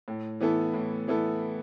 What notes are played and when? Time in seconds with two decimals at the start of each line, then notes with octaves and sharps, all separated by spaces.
0.08 A2
0.40 E3 B3 E4 A4
0.74 A2
1.08 E3 B3 E4 A4